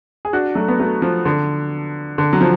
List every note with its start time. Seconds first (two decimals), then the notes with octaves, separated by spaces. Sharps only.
0.25 G#4
0.33 D4 F#4
0.55 F#3 A3
0.68 B3
0.79 F#3 A3
1.02 F3
1.25 D3
2.18 D3
2.33 F#3
2.41 F3